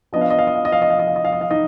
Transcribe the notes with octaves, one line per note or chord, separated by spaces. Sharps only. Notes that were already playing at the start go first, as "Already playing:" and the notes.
F3 B3 D4 D#5
F5
D#5
F5
D#5
F5
D#5
F5
D#5
F5
D#5
F5
D#5
F5
D#5
F5
D#4 D#5